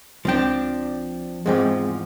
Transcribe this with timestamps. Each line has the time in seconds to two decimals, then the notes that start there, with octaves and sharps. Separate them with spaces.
0.25 C#2 F3 C4 D4 G5
1.46 E2 G#2 F3 G#3 C4